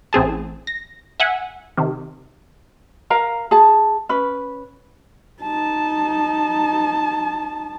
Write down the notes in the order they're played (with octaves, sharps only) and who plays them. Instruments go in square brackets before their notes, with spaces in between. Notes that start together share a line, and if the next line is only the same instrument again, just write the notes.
[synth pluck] A1 C4 G#4 A5
A#6
E5 F#5 G#5
C3 D#3
[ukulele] A#4 F5 A#5
G#4 A5
C#4 B4
[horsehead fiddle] D#4 A5